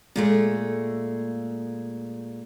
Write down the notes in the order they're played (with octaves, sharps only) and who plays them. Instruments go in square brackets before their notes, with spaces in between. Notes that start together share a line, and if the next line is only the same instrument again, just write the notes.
[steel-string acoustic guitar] A#2 G#3 A3